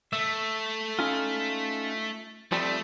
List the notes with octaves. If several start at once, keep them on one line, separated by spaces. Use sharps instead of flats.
A3 E5
C#4 D#4 F4
F3 G3 A3 C4